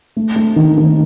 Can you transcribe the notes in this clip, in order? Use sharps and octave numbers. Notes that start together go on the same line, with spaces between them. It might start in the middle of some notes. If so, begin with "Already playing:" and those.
A3
A3
D#3
D#3